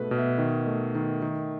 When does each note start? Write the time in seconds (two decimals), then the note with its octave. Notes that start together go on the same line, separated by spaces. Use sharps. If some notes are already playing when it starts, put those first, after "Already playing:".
Already playing: G#2 B2 A3 A4 B4
0.11 B2
0.18 E5
0.38 D#3
0.67 A3
0.95 D#3
1.22 D#3